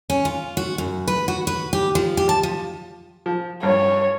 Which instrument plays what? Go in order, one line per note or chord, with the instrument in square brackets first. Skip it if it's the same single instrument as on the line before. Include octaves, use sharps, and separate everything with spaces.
[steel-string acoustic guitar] C#4
F4
F#4
F#2
B4
F#4
B4
G4
F3
G4
A5
F3
[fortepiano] F3
[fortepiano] G2 [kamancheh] C#5